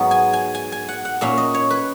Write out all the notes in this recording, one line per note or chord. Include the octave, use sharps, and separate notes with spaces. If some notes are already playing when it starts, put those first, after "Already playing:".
Already playing: G#2 F#3 B3
G#5
G#5
G#5
G#5
F#5
F#5
A#2 A#3 C#4 E5
D#5
C#5
B4